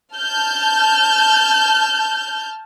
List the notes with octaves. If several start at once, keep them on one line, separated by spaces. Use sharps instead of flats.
A5 F6 G6